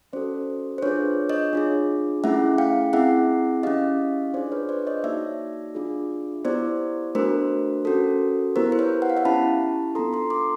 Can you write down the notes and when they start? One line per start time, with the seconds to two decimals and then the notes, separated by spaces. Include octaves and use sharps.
0.13 C#4 F#4 A4 C5 D5
0.78 C5
0.83 D4 F4 G#4 B4 C#5
1.29 C#5 D#5
1.53 D4 F4 G#4
2.24 A3 C#4 E4 G#4 E5 F#5
2.58 F5 G5
2.93 C4 E4 G#4 E5 F#5
3.63 C#4 E4 G4 D#5 F5
4.34 D4 F4 G#4 C5 D5
4.51 B4 C#5
4.69 C5 D5
4.87 C#5 D#5
5.04 A#3 D#4 F#4 D5 E5
5.75 D4 F4 G#4
6.45 B3 E4 G4 C5 D5
7.15 A3 D4 F#4 A#4 C5
7.85 C#4 F#4 A4
8.56 B3 E4 G4 A#4 C5
8.72 C5
8.79 B4 C#5
9.02 F#5
9.10 F5
9.17 E5 F#5
9.25 C#4 E4 G4 A5 B5
9.95 B3 D4 F4 A4 A#5 C6
10.13 A#5 C6
10.30 C6 D6